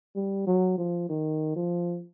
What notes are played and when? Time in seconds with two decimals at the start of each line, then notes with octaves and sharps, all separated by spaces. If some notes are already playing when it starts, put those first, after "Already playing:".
0.16 G3
0.47 F#3
0.78 F3
1.09 D#3
1.56 F3